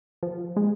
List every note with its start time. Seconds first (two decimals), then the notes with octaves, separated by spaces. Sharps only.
0.23 F3
0.57 G#3